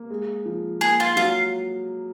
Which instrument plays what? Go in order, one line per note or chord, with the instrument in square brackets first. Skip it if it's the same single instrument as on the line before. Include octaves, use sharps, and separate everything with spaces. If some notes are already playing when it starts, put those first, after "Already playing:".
Already playing: [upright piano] A#3
G#3
F3
[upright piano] A#3 [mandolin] G#4
[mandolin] F4
[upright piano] F#3 [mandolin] F4